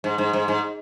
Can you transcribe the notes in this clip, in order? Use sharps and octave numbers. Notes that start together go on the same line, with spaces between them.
G#2
G#2
G#2
G#2